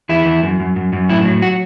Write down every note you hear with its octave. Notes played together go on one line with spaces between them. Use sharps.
E2 E4
E2
F#2
F#2
F#2
F#2
A2 E4
F#3
F#4